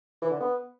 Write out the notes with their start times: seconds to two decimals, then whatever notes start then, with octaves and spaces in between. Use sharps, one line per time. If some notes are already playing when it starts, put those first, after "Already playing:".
0.22 E3
0.31 D3
0.40 B3